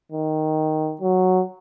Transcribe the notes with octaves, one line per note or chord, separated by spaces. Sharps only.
D#3
F#3